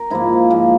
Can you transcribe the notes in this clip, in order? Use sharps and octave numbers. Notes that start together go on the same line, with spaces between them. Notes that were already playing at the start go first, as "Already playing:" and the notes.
Already playing: A#4
G#2 F3 A#3 E4
G#2 F3 A#3